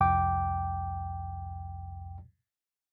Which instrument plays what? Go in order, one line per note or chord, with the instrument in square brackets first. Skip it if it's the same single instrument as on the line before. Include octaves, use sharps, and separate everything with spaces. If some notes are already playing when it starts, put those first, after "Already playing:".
[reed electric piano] C2 F2 G5 D6